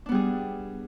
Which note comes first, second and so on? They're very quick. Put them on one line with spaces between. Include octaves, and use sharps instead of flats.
D4 B3 G3 G#4